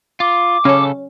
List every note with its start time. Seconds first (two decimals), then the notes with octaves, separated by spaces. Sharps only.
0.20 F4 D6
0.65 C#3 C#4 A4